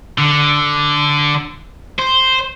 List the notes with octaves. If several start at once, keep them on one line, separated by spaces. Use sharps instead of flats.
D3
C5